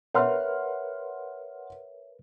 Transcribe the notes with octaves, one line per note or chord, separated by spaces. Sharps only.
A#4 B4 C#5 E5 F#5 C6 F6